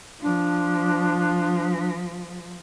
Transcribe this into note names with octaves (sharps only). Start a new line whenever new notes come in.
F3 D4